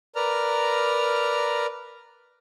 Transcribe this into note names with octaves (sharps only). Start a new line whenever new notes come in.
A#4 B4 D5 A#5 F6